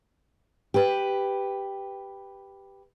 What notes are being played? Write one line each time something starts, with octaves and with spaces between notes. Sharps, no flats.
G4 B4